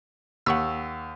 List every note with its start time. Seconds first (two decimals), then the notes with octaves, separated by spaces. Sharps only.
0.46 D#2 F#5 C#6 E6